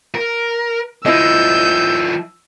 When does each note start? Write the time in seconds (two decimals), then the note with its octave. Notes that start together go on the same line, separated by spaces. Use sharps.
0.15 A#4
1.06 F3 D#4 E4 C5 D#5 E6 G6